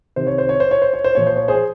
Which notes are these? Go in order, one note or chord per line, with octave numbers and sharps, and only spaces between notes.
C3 D#3 C5
C#5
C5
C#5
C5
C#5
C5
C#5
C5
A#2 F3 C#5
C5
C#5
G#4 C5